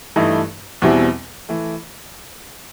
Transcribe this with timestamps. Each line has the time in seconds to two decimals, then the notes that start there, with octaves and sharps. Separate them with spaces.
0.16 G2 E3 A3 D#4
0.82 E2 B2 G3 C4 E4
1.49 E3 A3